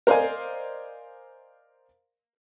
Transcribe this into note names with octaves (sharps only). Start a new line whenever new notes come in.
A#4 C5 D5 D#5 F5 G#5